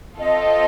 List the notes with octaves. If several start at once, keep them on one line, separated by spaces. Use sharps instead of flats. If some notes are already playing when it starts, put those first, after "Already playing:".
C4 F4 A4 D#5